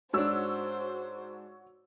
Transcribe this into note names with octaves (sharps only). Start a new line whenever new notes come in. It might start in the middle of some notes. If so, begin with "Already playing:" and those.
G#2 D4 F#4 C5 C#5 E6